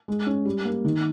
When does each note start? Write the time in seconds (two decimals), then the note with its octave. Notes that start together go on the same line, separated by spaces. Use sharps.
0.08 G#3
0.27 C#4
0.45 G3
0.65 A#3
0.85 D#3